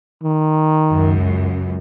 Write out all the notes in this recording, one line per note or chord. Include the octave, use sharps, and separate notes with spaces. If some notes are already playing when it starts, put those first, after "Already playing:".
D#3
C#2 F#2